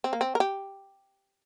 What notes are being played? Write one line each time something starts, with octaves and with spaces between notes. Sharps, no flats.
C4
A#3
C4
A#4
G4